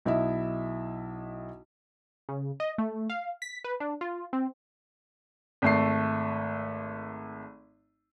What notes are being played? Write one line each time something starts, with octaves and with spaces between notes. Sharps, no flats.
B1 E4 D#5 E5
C#3
D#5
A3
F5
B6
B4
D4
F4
C4
G#1 A3 C7